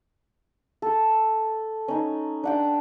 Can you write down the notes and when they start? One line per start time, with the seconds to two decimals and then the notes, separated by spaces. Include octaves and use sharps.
0.82 A4
1.88 C#4 D#4
2.44 D4 F#5 G5